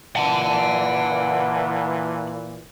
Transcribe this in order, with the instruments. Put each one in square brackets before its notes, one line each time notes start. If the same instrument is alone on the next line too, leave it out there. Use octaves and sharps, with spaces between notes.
[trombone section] A#2 E3 [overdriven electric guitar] F#5 A5